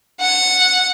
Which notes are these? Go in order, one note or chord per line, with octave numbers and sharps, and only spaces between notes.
F#5